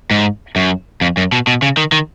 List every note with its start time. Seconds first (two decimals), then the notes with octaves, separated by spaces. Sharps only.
0.11 G#2
0.56 F#2
1.01 F2
1.17 F#2
1.32 B2
1.47 B2
1.62 C#3
1.77 D#3
1.92 D#3